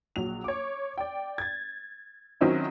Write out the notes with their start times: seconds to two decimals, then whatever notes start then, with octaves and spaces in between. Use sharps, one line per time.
0.16 A#1 F#3 F7
0.44 C#5 D6
0.98 D5 G5
1.38 G#6 A6
2.41 D#3 F#3 C4 C#4 D#4 E4